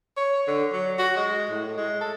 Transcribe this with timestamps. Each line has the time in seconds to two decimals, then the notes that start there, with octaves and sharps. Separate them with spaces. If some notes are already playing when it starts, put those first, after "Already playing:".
0.17 C#5
0.48 D3
0.73 F#3
0.98 F#4
1.17 G#3
1.50 A2
1.77 G#3
2.01 A4